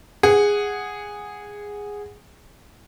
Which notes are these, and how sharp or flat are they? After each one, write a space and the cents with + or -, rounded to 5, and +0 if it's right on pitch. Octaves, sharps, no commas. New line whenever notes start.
G#4 -10 F#5 +0